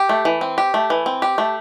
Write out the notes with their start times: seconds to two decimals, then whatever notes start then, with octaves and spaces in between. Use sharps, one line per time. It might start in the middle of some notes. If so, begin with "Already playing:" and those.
Already playing: G4
0.09 A3
0.25 E3
0.41 C4
0.58 G4
0.74 A3
0.90 E3
1.06 C4
1.22 G4
1.38 A3